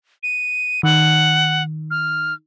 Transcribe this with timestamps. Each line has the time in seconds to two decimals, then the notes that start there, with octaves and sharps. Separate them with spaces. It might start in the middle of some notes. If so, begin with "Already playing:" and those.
0.23 D#7
0.83 D#3 F#5
1.91 F6